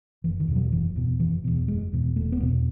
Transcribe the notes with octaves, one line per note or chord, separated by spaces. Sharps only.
F#1 E3
D#3
E2 B2
F#3
F#1 E3
E2 B2
F#1 E3
E2 B2
F#1 G#3
E2 B2
E1 A3
B3
E2 B2